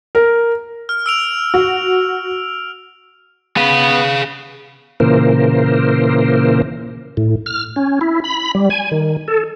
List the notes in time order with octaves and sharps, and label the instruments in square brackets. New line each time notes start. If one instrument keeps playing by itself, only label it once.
[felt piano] A#4
[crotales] F6
E6 D7 F7
[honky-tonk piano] F#4
[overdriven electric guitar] B3 [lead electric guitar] G#4 F5
[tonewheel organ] A#2 C#3 E3 A#3 A#4 C5
A2
F6
C#4
E4
B5
G3
G#5
D#3
A4